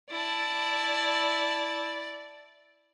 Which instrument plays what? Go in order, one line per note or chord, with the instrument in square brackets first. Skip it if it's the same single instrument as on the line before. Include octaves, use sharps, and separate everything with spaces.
[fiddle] E4 A5 [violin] D5